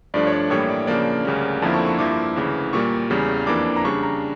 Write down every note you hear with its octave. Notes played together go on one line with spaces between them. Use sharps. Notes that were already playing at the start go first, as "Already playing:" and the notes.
G2 F3 A3 D4 D5
C#5
D5
A2 E3 G3 A#3 C#5
D5
C#3 F3 A#3 D4 D5
D2 C#3 G3 A#3 C#4
F2 D3 F3 A#3 E4 A5
C#6
C#6
G2 F3 A#3 E4 D6
D2 C#3 E3
A#2 G3 A#3 C#6
E2 C#3 G3
F2 E3 A#3 D4 D6
A#5
C#3 G3 D4 C#6
A#5